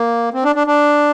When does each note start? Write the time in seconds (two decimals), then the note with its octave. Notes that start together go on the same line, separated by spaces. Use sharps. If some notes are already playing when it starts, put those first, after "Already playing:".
Already playing: A#3
0.34 C4
0.44 D4
0.56 D4
0.67 D4